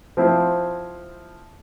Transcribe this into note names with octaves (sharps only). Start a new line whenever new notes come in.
F3 C4 E4